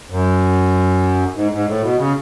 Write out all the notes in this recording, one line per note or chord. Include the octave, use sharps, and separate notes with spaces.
F#2
G#2
G#2
A2
B2
C#3